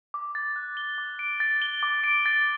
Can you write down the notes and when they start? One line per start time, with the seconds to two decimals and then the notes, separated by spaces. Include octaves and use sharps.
0.14 D6
0.35 A6
0.56 F#6
0.77 G7
0.98 D6
1.19 D7
1.40 A6
1.62 G7
1.83 D6
2.04 D7
2.26 A6